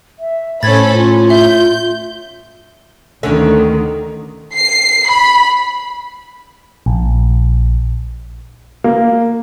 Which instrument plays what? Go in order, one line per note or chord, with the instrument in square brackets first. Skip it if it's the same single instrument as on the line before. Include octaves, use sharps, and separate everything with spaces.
[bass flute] E5
[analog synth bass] A2 [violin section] C#4 A4 B5 [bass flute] C5 [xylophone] G#6 A6
[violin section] C#4 [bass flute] F4
[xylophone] E5 [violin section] G6
[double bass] D2 D#3 [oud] D3 A3 C#4
[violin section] C7
B5
[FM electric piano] A#1
[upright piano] A#3